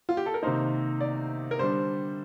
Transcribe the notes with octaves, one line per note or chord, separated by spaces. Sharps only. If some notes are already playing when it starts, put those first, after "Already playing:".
F4
G4
A4
A#4
C3 D#3 A#3 D#4 C5
D5
A#4
D3 G3 D4 C5